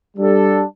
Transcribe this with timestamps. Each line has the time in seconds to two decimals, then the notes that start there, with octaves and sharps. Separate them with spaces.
0.16 G3 D4 A4